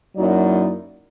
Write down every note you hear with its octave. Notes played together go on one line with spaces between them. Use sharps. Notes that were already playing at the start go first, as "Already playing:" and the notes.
F#2 F#3 A#3 D#4 E4 D5